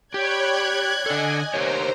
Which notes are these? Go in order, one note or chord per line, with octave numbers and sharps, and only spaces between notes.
G4 C#5 D5 G5 B5 F#6 G#6
D3 A4 D#5 G#5
G4 A#4 C5 C#5 A#5